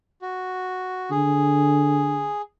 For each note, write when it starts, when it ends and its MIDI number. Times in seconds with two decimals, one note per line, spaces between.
0.22 1.10 66
1.11 2.30 50
1.11 2.42 68